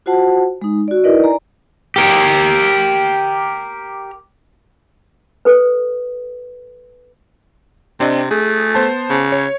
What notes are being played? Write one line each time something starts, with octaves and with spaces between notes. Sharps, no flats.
F4 F#4 C5 F#5 A5
G#3 D#4
F#4 D5
D#4 E4 A#4 B4 D5 D#5
D5 G#5 A#5
G4 A#4
A4 B4
C3 C4 D4 D#5
A3 G#4
B3 C5 A5
C#3
C#5